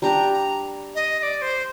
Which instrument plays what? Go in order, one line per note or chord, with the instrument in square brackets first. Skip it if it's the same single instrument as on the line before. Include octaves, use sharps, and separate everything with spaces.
[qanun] G3 D4 G4 [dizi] A#5
[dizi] A#5
D#5
D#5
D5
C5